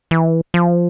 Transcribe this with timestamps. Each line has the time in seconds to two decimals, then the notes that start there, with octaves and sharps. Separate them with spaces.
0.11 E3
0.54 F3